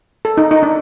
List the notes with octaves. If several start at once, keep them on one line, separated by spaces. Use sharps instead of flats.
A4
D#4
D#4
D4